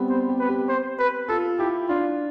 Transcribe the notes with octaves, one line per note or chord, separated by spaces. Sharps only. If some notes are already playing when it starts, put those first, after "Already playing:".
Already playing: G3 B3 C4
C5
G4
B4
G4
C5
B4
F4 A4
E4 G4
D4 F4